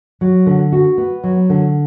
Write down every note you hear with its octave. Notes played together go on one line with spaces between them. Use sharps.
F#3
D3
F#4
B3
F#3
D3